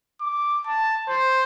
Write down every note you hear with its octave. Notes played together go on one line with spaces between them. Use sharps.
D6
A5
C5